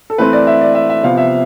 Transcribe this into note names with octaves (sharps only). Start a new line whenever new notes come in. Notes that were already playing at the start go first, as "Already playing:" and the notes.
A4
E3 A3 C4 B4
D5
E5
D5
E5
E5
C3 F3 B3 F5
E5